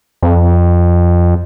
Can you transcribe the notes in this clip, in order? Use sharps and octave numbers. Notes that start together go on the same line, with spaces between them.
F2